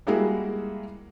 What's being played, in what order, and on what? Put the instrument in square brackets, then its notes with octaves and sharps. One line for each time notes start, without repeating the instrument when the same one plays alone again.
[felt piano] G3 G#3 A#3 E4 F#4 G#4